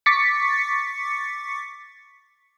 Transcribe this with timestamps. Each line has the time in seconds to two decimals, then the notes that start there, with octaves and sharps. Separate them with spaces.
0.06 C#6 D6 A6 B6 C#7